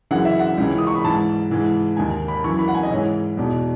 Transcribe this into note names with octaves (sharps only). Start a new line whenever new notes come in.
F#2 C#3 E3 F#5
E5
F#5
C#2 C#3 E3
D#6
C#6
B5
G#2 E3 A5
G#2 E3
D#2 D#3 G#5
B5
F#2 E3 C#6
B5
F#5
G#5
D#5
G#2 E3 C#5
E2 B2